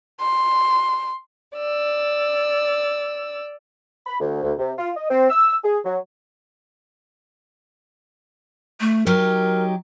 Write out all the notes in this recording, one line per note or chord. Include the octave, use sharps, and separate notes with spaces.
C6
D5 E6
B5
D2
D2
C3
F4
D#5
C4
E6
G#4
F#3
A3
F#3 D#4 G4 A#4